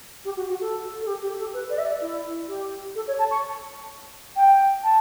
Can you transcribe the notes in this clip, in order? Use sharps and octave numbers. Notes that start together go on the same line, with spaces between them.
G4
F#4
F#4
A4
A4
G4
G4
A4
B4
D5
E5
D5
E4
G4
A4
C#5
A5
C#6
G5
A5